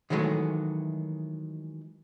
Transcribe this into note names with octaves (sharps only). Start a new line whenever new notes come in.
D#3 E3 F#3 G#3 A3